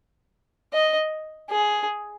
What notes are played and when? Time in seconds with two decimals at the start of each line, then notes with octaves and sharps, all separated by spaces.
0.73 D#5
1.50 G#4